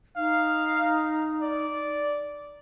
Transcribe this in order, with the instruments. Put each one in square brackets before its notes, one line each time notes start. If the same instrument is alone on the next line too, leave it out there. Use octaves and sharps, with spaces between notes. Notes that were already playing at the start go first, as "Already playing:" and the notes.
[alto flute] D#4 [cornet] F5
[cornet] D5